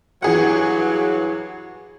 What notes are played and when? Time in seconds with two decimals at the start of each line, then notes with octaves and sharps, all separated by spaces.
0.22 G2 E3 F#3 G#4 F#5